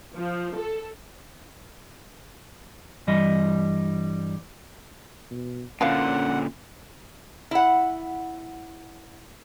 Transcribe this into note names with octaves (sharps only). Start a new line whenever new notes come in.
F3
A4
G2 E3 G3 D#5
B2
A#2 D3 E3 F3 C#4 F5 F#5
E4 F#5